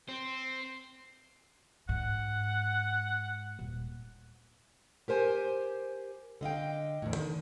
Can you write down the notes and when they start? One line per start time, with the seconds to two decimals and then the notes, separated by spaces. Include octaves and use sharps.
0.09 C4 C5
1.89 G#2 F#5
3.59 D#1
5.08 G4 A#4 C5 G#5
6.41 D3 D#5 F5 G5
7.02 E2 A2
7.16 D3 D#3